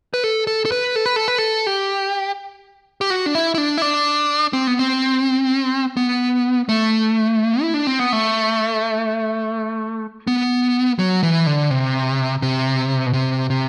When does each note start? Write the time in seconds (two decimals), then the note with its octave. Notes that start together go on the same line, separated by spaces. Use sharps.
0.14 B4
0.24 A4
0.47 A4
0.65 A4
0.72 B4
0.96 A4
1.06 B4
1.16 A4
1.28 B4
1.38 A4
1.67 G4
3.01 G4
3.10 F#4
3.26 D4
3.35 E4
3.54 E4
3.58 D4
3.78 E4
3.82 D4
4.53 C4
4.67 B3
4.79 C4
5.97 B3
6.69 A3
7.61 E4
7.74 D4
7.87 C4
7.99 B3
8.13 A3
10.27 B3
10.99 F#3
11.23 E3
11.46 D3
11.71 C3
12.42 C3
13.06 B2
13.13 C3
13.50 C3